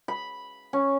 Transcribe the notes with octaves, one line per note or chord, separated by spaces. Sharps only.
B5
C#4